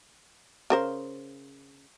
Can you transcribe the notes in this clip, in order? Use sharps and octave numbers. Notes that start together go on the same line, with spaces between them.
C#3 A#4 C5